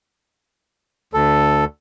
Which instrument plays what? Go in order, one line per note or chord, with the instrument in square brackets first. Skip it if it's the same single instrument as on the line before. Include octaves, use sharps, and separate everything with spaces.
[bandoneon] D2 A4